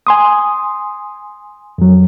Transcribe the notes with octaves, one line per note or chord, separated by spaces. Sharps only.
G#5 C6 D#6
F2 F#3